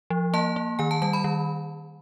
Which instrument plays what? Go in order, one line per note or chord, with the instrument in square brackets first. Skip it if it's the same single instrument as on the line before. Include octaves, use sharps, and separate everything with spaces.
[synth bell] F3
A#3 A5
A#3
D#3 G#5
A5
G3 A5
B5
D#3